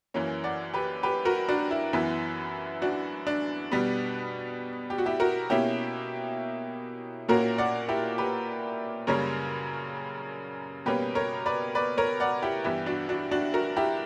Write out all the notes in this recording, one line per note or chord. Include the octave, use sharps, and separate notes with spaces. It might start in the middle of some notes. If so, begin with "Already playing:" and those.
F#2 E3 A#3 C#4
D5 F#5
G4 B4
G4 B4
F#4 A#4
D4 F#4
E4
F#2 E3 B3 E4
D4 F#4
D4
B2 G3 B3
G4
F#4
E4 G4
F#4 A#4
B2 A#3 C#4 E4 G4
A#2 A#3 C#4 F#4 A#4
D5 F#5
E4 G4
G4 B4
F#2 C#3 G3 A#3 A#4 C#5
B2 G3 A#3 C#4 G4 B4
A#4 C#5
B4 D5
B4 D5
A#4 C#5
D5 F#5
E4 G4
G2 E3 B3 E4 G4
D4 F#4
D4 F#4
D4 F#4
F#4 A#4
E4 G4